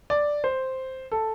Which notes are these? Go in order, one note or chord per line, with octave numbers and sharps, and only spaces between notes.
D5
C5
A4